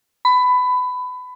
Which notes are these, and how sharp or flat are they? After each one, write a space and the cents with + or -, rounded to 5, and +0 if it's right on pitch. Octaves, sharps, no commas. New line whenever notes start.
B5 +20